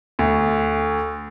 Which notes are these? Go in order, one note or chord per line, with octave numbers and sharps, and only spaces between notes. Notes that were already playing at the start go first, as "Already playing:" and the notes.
D2